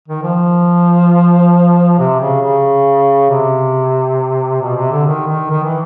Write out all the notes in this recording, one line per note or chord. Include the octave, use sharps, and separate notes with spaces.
D#3
F3
C3
C#3
C#3
C3
B2
C3
D3
D#3
D#3
D#3
E3